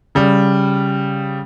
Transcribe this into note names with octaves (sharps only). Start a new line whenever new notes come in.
C#3 G3